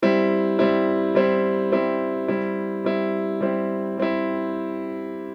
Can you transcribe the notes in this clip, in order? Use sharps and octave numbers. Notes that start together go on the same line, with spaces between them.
G3 C4 E4
G3 C4 E4
G3 C4 E4
G3 C4 E4
G3 C4 E4
G3 C4 E4
G3 C4 E4
G3 C4 E4